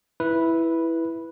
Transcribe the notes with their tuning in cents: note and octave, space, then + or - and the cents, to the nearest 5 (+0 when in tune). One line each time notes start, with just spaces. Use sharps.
E4 +0 B4 -5